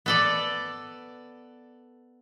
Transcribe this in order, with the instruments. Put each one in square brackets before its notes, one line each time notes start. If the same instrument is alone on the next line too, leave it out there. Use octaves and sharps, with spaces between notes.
[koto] B3 A4 D5